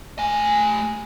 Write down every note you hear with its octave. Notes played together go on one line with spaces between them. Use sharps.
A3 G#5